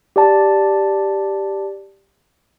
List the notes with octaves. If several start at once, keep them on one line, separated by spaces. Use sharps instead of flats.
G4 D5 A5